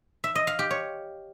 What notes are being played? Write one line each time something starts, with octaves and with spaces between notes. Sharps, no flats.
E5
D#5
F5
G4
C#5